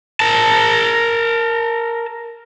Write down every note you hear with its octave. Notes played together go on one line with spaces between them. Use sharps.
A#4 A5